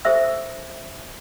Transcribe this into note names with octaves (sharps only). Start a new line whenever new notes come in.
G4 A4 C5 E5 E6